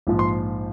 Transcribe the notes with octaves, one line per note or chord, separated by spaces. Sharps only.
A#1 G#2 F3
C6